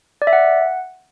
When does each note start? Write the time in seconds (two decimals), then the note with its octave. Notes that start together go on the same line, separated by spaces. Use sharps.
0.22 D5
0.27 E5
0.33 F#5